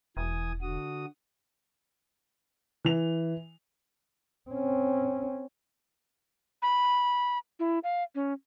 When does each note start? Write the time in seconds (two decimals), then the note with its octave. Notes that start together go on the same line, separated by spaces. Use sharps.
0.17 E1 E3 G#5 D#6
0.61 D3 F#4 D#6
2.85 E3 F7
4.50 C4 C#4
6.62 B5
7.60 E4
7.84 F5
8.15 C#4